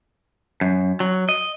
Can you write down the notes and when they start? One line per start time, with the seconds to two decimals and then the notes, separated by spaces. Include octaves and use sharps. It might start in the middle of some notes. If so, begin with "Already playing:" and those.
0.61 F#2
1.00 F#3
1.29 D#5